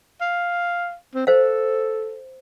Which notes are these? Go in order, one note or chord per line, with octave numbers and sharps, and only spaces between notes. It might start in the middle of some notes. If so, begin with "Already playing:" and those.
F5
C4
A4 C5 F5